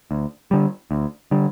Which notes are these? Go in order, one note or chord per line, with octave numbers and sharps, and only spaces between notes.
D2
D3 G3
D2
D3 G3